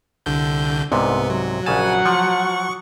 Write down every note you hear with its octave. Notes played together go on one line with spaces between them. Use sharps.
C2 D3 G6
C2 G#2 C3 B3
F#3
A#1 C#3 F#3 F#5 G#5 A5
F3 C#6